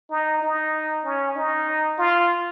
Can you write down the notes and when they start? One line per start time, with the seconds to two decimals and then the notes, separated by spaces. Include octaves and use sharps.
0.10 D#4
0.42 D#4
1.05 C#4
1.36 D#4
1.98 F4